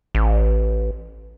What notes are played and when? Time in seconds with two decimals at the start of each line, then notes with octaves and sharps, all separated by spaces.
0.15 A1